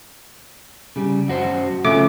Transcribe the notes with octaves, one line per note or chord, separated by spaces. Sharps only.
C#3 G3
F#2 F#4 C5
C#3 F3 A3 C#4 D6